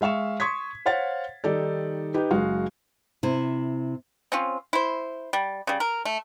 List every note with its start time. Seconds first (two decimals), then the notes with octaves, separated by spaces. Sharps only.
0.01 G#3 E5 F5 C#6 E7
0.40 C6 C#6 D#6 G#6 B6
0.86 C5 C#5 F5 F#5 A6
1.44 D#3 G3 D#4 A4 D5
2.14 D#4 G4 B4
2.31 F#1 G#3 F#4 F5
3.23 C3 E4
4.32 C4 C#4 F4
4.73 E4 C5
5.33 G3
5.67 C#3 G3
5.80 A#4
6.05 A3